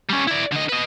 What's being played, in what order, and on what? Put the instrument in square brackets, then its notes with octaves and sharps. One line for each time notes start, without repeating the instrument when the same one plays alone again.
[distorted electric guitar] G3 C#4
E4 D5
D3 D#5
B4 D#5